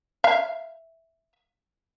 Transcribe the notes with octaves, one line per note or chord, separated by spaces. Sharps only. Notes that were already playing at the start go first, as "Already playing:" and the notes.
E5 F5